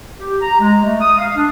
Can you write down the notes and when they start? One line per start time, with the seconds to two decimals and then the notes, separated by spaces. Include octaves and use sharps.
0.19 G4
0.42 A#5
0.59 G#3
0.84 A3
1.01 D#6
1.18 F5
1.37 D4